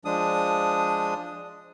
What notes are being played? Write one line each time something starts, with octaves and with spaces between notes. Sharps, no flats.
F3 G#3 D4 D#6